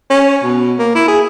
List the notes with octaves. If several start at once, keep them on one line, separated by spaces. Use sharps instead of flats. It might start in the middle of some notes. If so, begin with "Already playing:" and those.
C#4
B2
A#3
E4
G#4